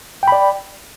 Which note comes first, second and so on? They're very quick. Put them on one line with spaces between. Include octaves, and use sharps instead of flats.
G5 B5 D5